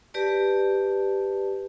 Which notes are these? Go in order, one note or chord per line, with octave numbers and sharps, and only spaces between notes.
G4 B4 D5 A5